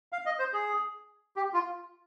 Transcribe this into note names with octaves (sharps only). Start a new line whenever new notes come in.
F5
D#5
C5
G#4
G4
F4